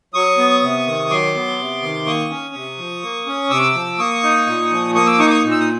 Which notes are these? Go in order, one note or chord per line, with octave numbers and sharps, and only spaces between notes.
F#3 C#6 D#6
B3
C3
D#3
F#3 C6 D6
B3
C3
D#3
A#3 C#6 D#6
C#4
C3
F3
A#3
C#4
C3 D6 E6
F3
A#3 C#6 D#6
D#4
A#2
F3
A#3 C#6 D#6
D6 E6
D#4 C#6 D#6
D6
C#6 D#6
A#2
E6
D#6